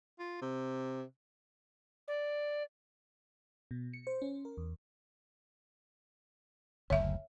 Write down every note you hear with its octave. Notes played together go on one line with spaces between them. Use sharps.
F4
C3
D5
B2
C#7
C5
C#4
A#4
E2
F#1 D2 C#5 E5